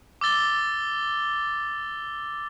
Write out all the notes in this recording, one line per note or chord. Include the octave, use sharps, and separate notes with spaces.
D6 E6 A6 G7